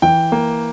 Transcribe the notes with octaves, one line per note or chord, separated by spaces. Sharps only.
E3 G5
A#3